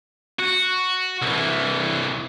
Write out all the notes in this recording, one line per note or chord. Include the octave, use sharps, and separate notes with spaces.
F#4
C2 E3